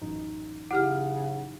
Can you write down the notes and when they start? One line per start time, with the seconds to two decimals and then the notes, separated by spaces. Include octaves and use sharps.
0.01 A1 F#2 D#4
0.71 C#3 E4 G4 F#5 F6